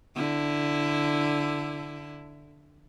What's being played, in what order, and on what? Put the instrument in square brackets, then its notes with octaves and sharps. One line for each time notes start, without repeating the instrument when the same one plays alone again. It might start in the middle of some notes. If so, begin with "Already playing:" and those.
[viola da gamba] D3 E4